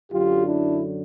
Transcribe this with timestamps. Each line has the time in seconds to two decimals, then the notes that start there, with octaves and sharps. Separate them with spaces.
0.12 F#2 D3 F#3 F4 G4
0.45 D4 E4